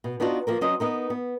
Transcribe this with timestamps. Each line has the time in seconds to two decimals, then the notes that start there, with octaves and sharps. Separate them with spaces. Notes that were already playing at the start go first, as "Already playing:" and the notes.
0.04 B2
0.20 B3 D4 D#4 F4 F#4
0.47 F3 A#3 A#4
0.61 F#3 C#4 C5 D#5
0.80 B3 D#4 A#4
1.10 B3